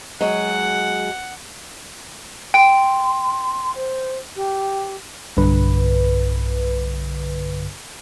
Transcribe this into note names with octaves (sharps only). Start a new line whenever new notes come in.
F#3 G#3 F#5
G5 C6 D7
C5
G4
B1 G2 D3 B4